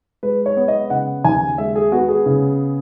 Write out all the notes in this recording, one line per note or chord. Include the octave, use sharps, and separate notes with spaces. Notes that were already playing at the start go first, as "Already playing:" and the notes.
G#3 B4
C#5
B3
D#5
C#3 F#5
D#2 G#5
G#3 E5
G#4
B3 F#4
G#4
C#3